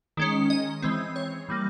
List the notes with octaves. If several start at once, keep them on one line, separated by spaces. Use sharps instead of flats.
D#3 G#3 C#4
D#5
E3 G#3 C4
C#5
E3 G3 A#3